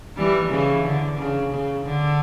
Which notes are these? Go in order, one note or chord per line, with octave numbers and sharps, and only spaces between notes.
E3 G3
C#3 E3
D3
C#3
C#3
D3